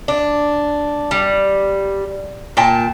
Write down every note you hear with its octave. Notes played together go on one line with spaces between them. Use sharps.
D4
G3
A#2 G5 A5